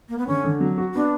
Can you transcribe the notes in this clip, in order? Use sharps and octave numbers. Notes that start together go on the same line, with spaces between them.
A#3
B3
D3 C#4
D3
F#3
F#4
B3 D4